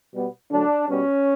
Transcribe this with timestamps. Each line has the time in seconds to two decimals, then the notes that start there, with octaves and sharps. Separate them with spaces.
0.14 B2 G3 B3
0.51 D3 F#3 A3 D4
0.88 B2 G3 B3 C#4